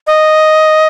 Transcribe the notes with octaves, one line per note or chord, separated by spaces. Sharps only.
D#5